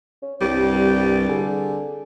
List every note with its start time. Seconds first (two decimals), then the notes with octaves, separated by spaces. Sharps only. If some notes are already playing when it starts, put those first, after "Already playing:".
0.22 C#4
0.41 C2 G2 G3
1.29 D3 G#4